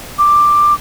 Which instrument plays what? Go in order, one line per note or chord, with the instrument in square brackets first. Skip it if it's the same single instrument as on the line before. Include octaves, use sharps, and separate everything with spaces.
[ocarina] D6